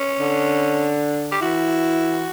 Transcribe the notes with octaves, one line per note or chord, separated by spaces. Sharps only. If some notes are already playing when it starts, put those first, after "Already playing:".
Already playing: C#4
D3 D4
G4
E3 E4 F#4